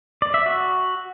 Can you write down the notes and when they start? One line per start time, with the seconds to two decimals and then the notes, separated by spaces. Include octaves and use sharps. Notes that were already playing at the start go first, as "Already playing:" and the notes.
0.22 D5
0.34 E5
0.46 F#4